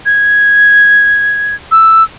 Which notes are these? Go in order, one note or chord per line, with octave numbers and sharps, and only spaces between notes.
G#6
E6